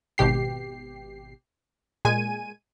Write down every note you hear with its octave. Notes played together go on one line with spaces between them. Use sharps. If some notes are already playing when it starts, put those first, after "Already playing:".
G#1 B2 G4 C7
A#2 G#3 G#5 D#7